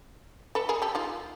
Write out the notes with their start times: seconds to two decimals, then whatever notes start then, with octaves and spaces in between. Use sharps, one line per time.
0.55 A4 B4
0.69 G#4 A#4
0.82 G4 A4
0.95 D#4 F4